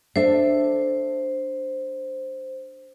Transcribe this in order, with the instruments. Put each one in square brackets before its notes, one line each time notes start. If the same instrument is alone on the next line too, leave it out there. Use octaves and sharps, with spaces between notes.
[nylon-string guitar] D4 A4 E5 [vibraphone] C5